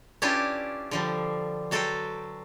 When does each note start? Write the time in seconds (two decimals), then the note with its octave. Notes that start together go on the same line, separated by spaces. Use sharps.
0.22 C#4 D4 E4 F4 G4 B4
0.91 D3 F3 G3
1.71 F#3 F#4 A4 B4 C5 G5